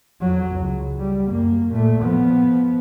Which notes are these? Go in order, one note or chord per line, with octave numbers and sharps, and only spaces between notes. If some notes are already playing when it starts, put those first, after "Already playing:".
F2 F#3
C#2
G3
F#2 A#3
A#2 A3
F3 B3